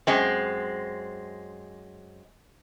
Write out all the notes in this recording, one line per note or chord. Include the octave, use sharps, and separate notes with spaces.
F#2 G#3 C4